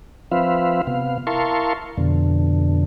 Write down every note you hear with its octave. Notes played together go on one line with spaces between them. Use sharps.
F3 C4 F4 B4 E5 F5
C3 B3 F5
E4 A#4 F5 A5 C6 C#6
F2 B2 D3